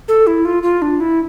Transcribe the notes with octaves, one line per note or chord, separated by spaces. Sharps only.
A4
E4
F4
F4
D4
E4